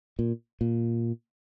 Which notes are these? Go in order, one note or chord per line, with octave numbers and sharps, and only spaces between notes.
A#2
A#2